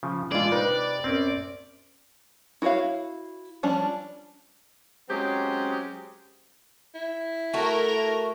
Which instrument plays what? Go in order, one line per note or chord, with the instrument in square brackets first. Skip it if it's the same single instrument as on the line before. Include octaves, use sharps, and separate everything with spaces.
[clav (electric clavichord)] C#3 F3
[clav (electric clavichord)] E3 G#4 [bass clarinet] G#3 [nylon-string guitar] D4 F4 [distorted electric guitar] D5
[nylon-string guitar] C3 [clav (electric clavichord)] D#4 [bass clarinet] B4
[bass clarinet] F#2 [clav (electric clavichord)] C4 C#4
[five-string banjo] E4 F#4 B4 C#5 F5
F3 G3 C#4 D4
[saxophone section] F#3 G#3 C4 C#4 G4
[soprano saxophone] E4
[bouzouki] A3 F#4 [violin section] A#4